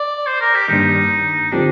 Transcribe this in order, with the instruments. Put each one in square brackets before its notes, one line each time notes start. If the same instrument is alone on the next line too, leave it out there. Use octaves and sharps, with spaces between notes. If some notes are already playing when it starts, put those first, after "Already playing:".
Already playing: [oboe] D5
C5
A#4
G4
[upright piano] G2 D#3 G3 A#3 D4 [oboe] D#4
[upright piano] D3 F3 C4 G4 [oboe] D4